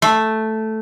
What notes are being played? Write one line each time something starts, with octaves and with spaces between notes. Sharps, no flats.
A3